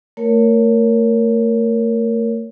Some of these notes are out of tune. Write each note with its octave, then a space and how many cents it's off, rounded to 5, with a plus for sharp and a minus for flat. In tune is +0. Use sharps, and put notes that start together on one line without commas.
A3 +35 A#4 +0 C#5 +15